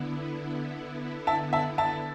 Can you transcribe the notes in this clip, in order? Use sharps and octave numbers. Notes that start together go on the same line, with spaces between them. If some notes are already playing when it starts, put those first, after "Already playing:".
Already playing: D3 B3 E4
E5 A5
E5 A5
E5 A5